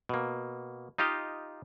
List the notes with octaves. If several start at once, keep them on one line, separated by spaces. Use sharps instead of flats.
B2 A#3
D#4 F4 G4 D#5 F5